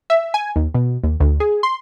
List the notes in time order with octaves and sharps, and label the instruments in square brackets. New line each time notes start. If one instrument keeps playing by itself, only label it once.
[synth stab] E5
G#5
D#2
B2
D#2
D2
G#4
C6